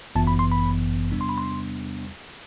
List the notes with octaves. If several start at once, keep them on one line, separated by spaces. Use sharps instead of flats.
G1 F#2 E3 B3 A5
B5
C6
B5
E2 C3 G3 B3 D4
C6
B5
C6